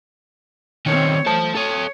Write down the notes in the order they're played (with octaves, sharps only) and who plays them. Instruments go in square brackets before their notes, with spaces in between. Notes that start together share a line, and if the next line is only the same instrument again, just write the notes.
[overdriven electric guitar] D#3 C#4 [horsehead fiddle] C4 C#5
[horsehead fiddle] A3 [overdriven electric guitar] C5 A5
[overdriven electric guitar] A4 D#5 [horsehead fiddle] C#5